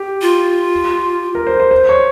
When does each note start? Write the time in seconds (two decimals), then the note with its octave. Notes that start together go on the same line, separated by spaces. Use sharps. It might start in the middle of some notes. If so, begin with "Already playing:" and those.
Already playing: G4
0.22 F4
1.35 A#4
1.47 C5
1.60 C5
1.71 C5
1.89 C#5